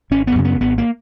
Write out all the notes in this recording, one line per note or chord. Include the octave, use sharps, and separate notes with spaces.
G#1 C#4
B3
F#2 C#3
B3
G#1 B3
A#3